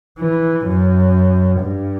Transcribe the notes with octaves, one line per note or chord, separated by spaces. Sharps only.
E3
F#2
G2